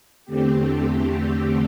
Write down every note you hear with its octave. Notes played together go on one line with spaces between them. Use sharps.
E2 D3 A3 C4 G4